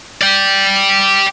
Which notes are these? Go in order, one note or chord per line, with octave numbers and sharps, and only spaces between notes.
D5 G5